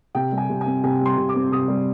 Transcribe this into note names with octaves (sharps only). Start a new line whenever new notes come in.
C3 G5
G3
G#5
C3
G#5
C4
C3 G#5
G3 C6
C3
D6
C4
C3 D#6
G3